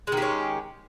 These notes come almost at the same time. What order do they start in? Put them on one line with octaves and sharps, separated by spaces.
G#3 D#3 G4 C#4